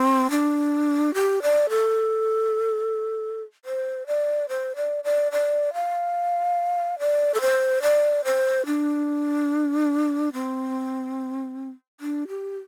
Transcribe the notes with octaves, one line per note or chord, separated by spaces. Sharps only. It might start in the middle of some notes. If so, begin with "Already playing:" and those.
Already playing: C4
D4
G4
D5
A4
C5
D5
C5
D5
D5
D5
F5
D5
A4
C5
D5
C5
D4
C4
D4
G4